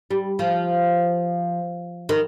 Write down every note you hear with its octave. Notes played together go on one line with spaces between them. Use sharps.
G3
F3
D#3